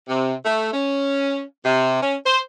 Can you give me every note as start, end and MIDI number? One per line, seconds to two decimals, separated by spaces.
0.09 0.33 48
0.45 0.73 57
0.73 1.41 61
1.64 2.01 48
2.01 2.15 61
2.25 2.39 72